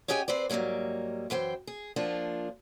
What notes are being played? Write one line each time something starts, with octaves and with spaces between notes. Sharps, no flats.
C#4 G4 G#4 D#5 G5 G#5
C4 B4 C5 D5
G#2 F#3 G3 A#3 C#4
F#2 E3 C5 G5
G#4
F3 A#3 D4 F4